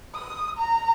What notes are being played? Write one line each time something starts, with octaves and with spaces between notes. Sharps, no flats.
D#6
A#5